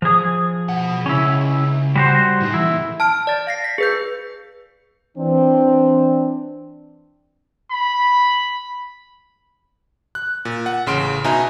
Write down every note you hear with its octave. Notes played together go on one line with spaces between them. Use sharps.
F3 G#4
B2 F#5
C#2 C#4 E4
G3 F#4 C5
A2 D#4
A#2 E3 E4
A5 F6 D7
D5 A6
F5 A#6 C7
B6
G#4 B4 G6
E3 C4 D4
B5
F#6
A#2
F#5
A1 C#3 C6 D7
B2 D#4 B4 E5 G#5 A#5